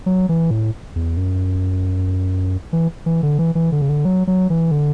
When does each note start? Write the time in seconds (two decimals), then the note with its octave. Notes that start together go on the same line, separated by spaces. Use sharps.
0.06 F#3
0.29 E3
0.51 A2
0.96 E2
1.17 F#2
2.73 E3
3.06 E3
3.23 D3
3.39 E3
3.55 E3
3.72 D3
3.82 C#3
3.89 D3
4.05 F#3
4.27 F#3
4.50 E3
4.71 D3